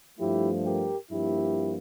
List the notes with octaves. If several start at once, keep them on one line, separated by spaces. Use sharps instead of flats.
G2 F3 A3 E4 G4
G4 A#4
G2 F3 A#3 E4 G4